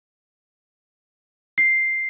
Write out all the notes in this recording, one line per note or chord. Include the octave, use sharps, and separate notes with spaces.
C7